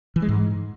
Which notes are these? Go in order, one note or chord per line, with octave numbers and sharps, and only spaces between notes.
E3
G#3
G#2